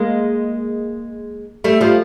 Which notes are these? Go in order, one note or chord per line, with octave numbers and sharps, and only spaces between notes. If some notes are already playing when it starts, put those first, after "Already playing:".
Already playing: G#3 A#3
G3 A3
F3 G3